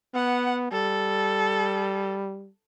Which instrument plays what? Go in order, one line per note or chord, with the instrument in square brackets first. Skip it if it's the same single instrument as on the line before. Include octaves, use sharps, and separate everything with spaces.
[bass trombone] B3 [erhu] F#5
[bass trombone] G3 [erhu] A4